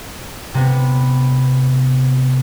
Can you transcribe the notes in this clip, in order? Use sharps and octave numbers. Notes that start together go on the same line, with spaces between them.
C3 B3